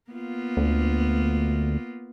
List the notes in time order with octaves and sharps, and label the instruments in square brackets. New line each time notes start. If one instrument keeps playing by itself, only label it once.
[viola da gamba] A#3 B3 F4
[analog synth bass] D2